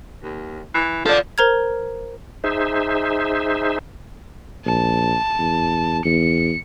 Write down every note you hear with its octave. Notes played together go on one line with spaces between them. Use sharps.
D#2
E3
F3 A4 D5
A#4 C5 A#5 F6 G#6
D#4 G#4 C5 E5
A#1 A5
E2
E2 C#7